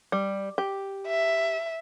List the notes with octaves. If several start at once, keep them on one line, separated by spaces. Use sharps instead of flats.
G3
G4
E5